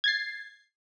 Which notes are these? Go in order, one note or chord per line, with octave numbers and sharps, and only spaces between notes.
G#6 A6 C7